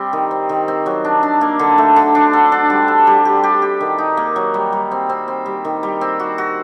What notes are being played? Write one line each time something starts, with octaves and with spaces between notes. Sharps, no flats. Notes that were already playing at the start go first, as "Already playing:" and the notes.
Already playing: G3 C4
D#3
C4
D#3
C4
F#3
D4
D4
A#3
D3
A3
D3
D4
A4
D4
G3
A4
G3
G4
G4
G4
D#3
D#4
A#3
F#3
G3
G3
C4
C4
C4
G3
D#3
G3
C4
F#4
F#4